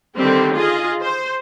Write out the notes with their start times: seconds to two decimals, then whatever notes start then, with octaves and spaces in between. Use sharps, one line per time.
0.16 D3 D#3 G3 C4 G4
0.54 F4 G#4 D#5
1.03 C5